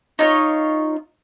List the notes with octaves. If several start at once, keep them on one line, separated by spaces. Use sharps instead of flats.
D#4 F4 C#5